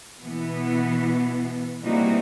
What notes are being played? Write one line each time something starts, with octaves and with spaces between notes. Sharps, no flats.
B2 E3 B3
C3 E3 G3 A#3 D#4 F#4